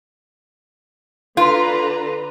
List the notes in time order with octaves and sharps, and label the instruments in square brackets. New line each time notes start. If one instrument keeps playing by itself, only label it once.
[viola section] D3 B4 A#5 [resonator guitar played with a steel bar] F4